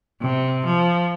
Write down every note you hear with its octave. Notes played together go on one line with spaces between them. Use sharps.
C3
F3